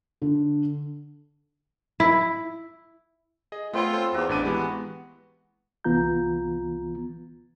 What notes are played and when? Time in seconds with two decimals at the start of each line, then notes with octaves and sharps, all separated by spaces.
0.22 D3
2.00 E4
3.52 G#4 D#5
3.73 A3 B3 C4 F4 C5 C#5
3.93 A4 C5 C6
4.14 E2 A#3 F#4
4.29 A1 D4 B4 D#7
4.43 E3 G#3 B3 G4
5.84 C2 E3 B3 F4 A#5 G6